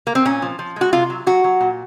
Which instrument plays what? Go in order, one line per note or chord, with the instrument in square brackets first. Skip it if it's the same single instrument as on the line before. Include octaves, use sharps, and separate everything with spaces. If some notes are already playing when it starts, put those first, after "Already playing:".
[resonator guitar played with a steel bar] A#3
C4
A#2 C#4
F3
F3
G#3 F#4
C3 F4
F#3
F#3 F#4
F#3
A#2